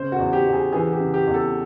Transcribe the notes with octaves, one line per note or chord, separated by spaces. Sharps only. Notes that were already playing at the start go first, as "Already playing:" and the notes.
Already playing: C#3 C5
F#4
E2
G4
E2
G#4
E3 G#4
G4
C#3
G4
E2
A4